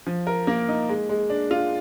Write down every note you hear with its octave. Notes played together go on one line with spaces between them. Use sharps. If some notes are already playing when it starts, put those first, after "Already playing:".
F3
A#4
A#3
D#4
G#3
G#3
D4
F4